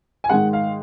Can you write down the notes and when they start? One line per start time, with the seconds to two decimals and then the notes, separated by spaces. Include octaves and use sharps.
0.24 G#5
0.29 G#2 D#3 G#3 F#5
0.53 F5